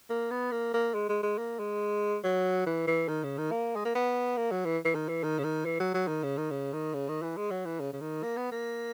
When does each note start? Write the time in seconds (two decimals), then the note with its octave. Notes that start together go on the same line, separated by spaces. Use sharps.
0.10 A#3
0.31 B3
0.52 A#3
0.74 A#3
0.95 G#3
1.09 G#3
1.23 G#3
1.38 A#3
1.59 G#3
2.24 F#3
2.66 E3
2.87 E3
3.08 D#3
3.24 C#3
3.38 D#3
3.52 A#3
3.76 G#3
3.85 A#3
3.95 B3
4.37 A#3
4.52 F#3
4.65 E3
4.85 E3
4.95 D#3
5.09 E3
5.23 D#3
5.39 C#3
5.44 D#3
5.65 E3
5.80 F#3
5.94 F#3
6.08 D#3
6.23 C#3
6.37 D#3
6.51 C#3
6.73 D#3
6.94 C#3
7.09 D#3
7.23 E3
7.37 G#3
7.51 F#3
7.66 E3
7.80 C#3
7.93 C#3
8.01 D#3
8.23 A#3
8.37 B3
8.52 A#3